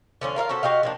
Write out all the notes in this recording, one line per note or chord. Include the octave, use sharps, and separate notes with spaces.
D3 F3 C#4 D4
F4 A#4 C#5 F5
C#4 F#4 A4 C5
F#4 G4 D#5 F5
F3 A#3 D4